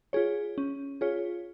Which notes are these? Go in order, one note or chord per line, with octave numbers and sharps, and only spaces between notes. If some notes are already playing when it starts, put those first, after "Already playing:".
F4 G#4 C#5
C#4
F4 G#4 C#5